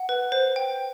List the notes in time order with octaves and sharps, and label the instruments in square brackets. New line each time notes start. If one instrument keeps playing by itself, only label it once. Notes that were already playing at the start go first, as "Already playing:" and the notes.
Already playing: [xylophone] F#5
B4
C5
G5